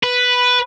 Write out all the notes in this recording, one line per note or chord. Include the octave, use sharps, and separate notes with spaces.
B4